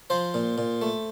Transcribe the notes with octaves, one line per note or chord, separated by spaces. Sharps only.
F3 C5
A#2
A#2
A3